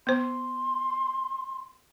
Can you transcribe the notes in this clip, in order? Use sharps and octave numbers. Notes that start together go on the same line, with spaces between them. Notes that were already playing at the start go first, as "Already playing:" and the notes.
B3 C5 C6